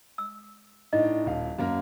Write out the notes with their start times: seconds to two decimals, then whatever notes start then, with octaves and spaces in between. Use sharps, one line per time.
0.18 E6
0.93 A2 D4 D#4 D#5
1.26 D#1 F5
1.59 F#2 A#3 A#4